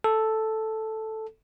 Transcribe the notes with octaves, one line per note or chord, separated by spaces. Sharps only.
A4